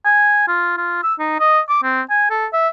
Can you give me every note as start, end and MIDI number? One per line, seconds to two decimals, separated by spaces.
0.05 0.43 80
0.48 0.75 65
0.77 1.03 65
1.03 1.14 88
1.19 1.38 63
1.40 1.60 75
1.69 1.79 86
1.83 2.02 60
2.10 2.26 80
2.30 2.47 69
2.53 2.68 76